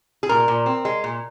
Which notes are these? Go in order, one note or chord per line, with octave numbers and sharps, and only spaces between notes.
G#4
A#2 A#4
A#2
C4
G#3
A#2